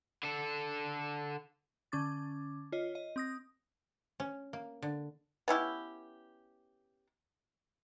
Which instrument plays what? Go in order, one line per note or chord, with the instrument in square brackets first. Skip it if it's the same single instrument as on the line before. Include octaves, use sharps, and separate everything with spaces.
[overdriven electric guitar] D3 A4
[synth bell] D3 C#4 D6 A6
F4 C#5 D#5
D#5
C4 D#6 A#6
[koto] C#4
A#3
D3
[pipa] B3 C#4 E4 G4